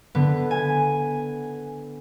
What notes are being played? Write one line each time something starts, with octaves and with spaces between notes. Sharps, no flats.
D3 B3
G#5